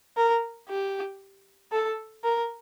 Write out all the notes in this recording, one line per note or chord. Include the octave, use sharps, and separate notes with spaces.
A#4
G4
A4
A#4